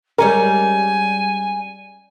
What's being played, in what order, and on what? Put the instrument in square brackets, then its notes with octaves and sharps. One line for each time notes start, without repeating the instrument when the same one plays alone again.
[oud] G3 G#3 C#4 [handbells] A#4 A#5 [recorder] G#5